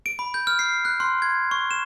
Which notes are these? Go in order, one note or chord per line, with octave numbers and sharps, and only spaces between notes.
D7
B5
G6
F6
C7
F#6
C6
G#6
C#6
E7